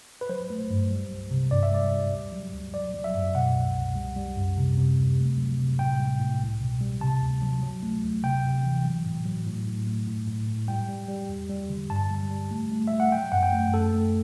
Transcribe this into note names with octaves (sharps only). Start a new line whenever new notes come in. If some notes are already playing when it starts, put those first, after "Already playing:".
B4
F#3 C5
A3
G2
G3
C2
C3
G2 D5
E5
G3 D5
G3
D2
F#3
D2
F#3 D5
F#3
E5
F#2
B2 F#5
C2
C2
G3
G3
F#2
C3
C3
D2
A3
F#3
C3
A2 G5
G3
A2
C2
B2
G3
C3 A5
D2
F#3
F#3
A3
D2
C3 G5
C3
E3
F#3
A2
F#3
A2
A2
A3
A2
A2
A2
G3 G5
G3
G3
E2
G3
D3
G2 A5
G3
G3
A3
A3
A3 E5
F#5
F#3 G5
F#2 F#5
G5
A3
F#2 A4
A3